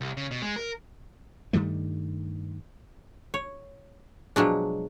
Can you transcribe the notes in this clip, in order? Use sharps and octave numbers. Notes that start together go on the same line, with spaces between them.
C2
C#3
B2
G#3
A#4
G2 D#3 G3 A3
C#5
B2 F3 F#3 G#3 D4